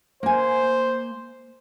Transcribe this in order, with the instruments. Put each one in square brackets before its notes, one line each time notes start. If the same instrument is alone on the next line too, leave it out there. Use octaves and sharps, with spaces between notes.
[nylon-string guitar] A#3 G#5 [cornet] C5